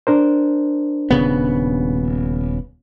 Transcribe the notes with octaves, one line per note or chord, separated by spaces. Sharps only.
D4 A#4 C5
D#1 C#3 B3